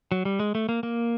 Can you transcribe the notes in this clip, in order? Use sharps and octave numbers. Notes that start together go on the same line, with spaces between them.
F#3
G3
G#3
A3
A#3
A#3